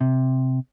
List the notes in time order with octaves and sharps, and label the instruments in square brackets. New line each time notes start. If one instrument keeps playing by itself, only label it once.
[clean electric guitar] C3